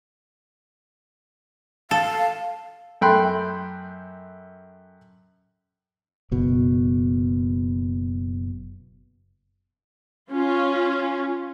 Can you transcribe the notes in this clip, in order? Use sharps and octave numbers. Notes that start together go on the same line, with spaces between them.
A4 F5
F#2 A3 G5 B5 C6 F#6
F#1 B2
C#4 F4